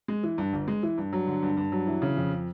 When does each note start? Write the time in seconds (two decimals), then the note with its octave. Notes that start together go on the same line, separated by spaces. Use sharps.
0.08 G#3
0.23 E3
0.38 G2
0.53 G1
0.68 G#3
0.83 E3
0.98 G2
1.13 F#3
1.27 D3
1.43 G2
1.57 G2
1.72 F#3
1.87 E3
2.02 C#3
2.17 F2